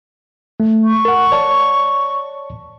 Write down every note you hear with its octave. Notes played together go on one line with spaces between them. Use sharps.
A3
C#6
A#4 F#5
C#5 D5 A5